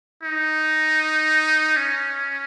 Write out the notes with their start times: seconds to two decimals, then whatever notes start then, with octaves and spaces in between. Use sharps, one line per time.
0.23 D#4
1.77 C#4